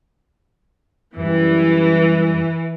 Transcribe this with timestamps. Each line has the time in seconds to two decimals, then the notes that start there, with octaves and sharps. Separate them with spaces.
1.16 F#2 E3 G3